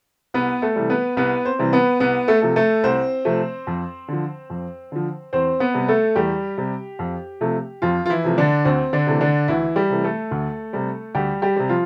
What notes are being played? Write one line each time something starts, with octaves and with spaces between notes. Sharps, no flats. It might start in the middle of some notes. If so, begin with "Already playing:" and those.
C2 B3 B4
A3 A4
C3 E3 G3
B3 B4
C2 B3 B4
C4 C5
C3 E3 G3
B3 B4
C2 B3 B4
A3 A4
C3 F3 A3
A3 A4
C2 C4 C5
C3 F3 A3
F2
D3 F3
F2
D3 F3
E2 C4 C5
B3 B4
C3 G3
A3 A4
E2 G3 G4
C3 G3
F2
C3 F3 A3
F2 F3 F4
F4
E3 E4
C3 F3 A3
D3 D4
D2 C4
D3 D4
C3 E3 A3
D3 D4
D2 E3 E4
G3 G4
C3 E3 A3
A3 A4
D2
C3 G3
D2 G3 G4
G3 G4
C3 G3
F3 F4